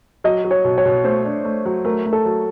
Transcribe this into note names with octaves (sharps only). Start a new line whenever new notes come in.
F#3 D#5
F#3
C#5
B2
C#5
B2
A3 C5
D4
A3
F#3
A3 A#4
A3
A4
F#3